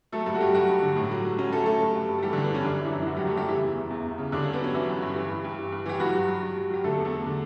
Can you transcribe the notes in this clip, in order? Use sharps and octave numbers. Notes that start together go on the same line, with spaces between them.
F#3 A3 A4
G2 A3 A4
F#4
F#3 G3 G4
G2 F#3 F#4
G2
D3
A2
F#3
F#3
F#3 C#4
F#3 A3 A4
F#3 A3 A4
G2
G2
G2
A4
E3 G3 G4
G2 D3 D4
B3
E3 C#4
F#2 D3 D4
F#2
E3 E4
F#2
E4
F#2 F#3 F#4
F#2 G3 G4
A3 A4
F#2 G3 G4
C#3 E3 E4
E2
E2
E2
E2
C#3
G2 D3 D4
G2 C#4
B3
F#3 C#4
E3 F#3 E4
G2
G2
E3
G2
G2
E3
G2
E3 G4
G2 F#3 F#4
F#3
F#3
G2
F#3
F#3 G4
D3 A3 A4
E2
A3 A4
E2
D3